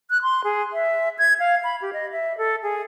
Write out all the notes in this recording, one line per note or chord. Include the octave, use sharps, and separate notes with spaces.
F#6
C6
G#4
E5
G#6
F5
B5
G4
D#5
E5
A4
G#4